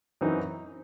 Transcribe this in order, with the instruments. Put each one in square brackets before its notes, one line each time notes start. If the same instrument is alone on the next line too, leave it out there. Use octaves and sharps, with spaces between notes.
[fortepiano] F#2 E3 C4 D#4